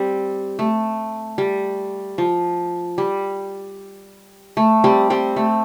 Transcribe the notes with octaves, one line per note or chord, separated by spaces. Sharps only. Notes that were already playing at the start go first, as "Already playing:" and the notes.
Already playing: G3 C4
A3
G3
F3
G3
A3
G3 C4
G3 C4
A3